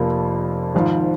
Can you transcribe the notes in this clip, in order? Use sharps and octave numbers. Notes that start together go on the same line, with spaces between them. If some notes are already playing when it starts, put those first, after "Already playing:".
Already playing: F1 F2 F3 A#3
G#1 G#2 F3